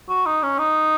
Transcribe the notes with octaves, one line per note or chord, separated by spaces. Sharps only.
F#4
D#4
C#4
D#4